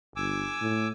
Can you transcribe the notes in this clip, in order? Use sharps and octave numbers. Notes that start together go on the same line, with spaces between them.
G1 G#5 D6 E6
A2